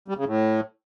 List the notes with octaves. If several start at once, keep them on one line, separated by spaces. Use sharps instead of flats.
G3
C#3
A2